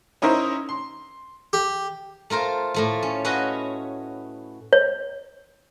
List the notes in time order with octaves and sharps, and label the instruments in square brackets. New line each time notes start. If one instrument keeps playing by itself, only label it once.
[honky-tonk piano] C#4 D#4 E4 A#4 C5
C6
[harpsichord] G4
[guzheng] A3 F4 A#4 C5
A2 A3 F4
C#4
C#4 F#4 B4 D#5 F5
[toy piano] C#5